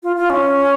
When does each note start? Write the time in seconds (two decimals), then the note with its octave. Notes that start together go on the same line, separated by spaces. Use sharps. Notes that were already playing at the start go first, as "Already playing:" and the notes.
0.03 F4
0.16 F4
0.30 C#4